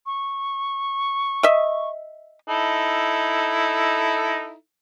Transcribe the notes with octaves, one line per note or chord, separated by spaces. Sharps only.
C#6
D#5 E5
D#4 E4 A4